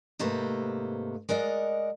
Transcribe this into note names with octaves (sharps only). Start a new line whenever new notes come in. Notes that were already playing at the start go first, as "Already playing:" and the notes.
G#2 C3 A3 A#3 B4 C5
G#3 A#4 D5 D#5 F#5